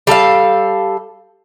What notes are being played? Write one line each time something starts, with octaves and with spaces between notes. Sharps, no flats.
G3 A4 A#4 F5